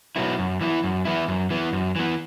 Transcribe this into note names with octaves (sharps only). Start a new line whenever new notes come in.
B2 F#3 B3 E4
F#2
E3 B3 E4
F#2
E3 B3 E4
F#2
E3 B3
F#2
E3 B3